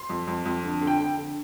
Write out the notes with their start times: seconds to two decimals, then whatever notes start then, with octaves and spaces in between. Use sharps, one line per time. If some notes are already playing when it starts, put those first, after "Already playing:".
Already playing: C6
0.10 F2
0.27 F2
0.45 F2
0.63 D3
0.81 D3
0.87 G5
0.99 D3
1.17 D3